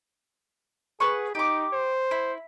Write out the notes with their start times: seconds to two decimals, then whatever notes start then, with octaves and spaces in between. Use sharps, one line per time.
1.00 G#4 B4 F#5 C#6
1.35 D#4 G4 D6
1.73 C5
2.11 E4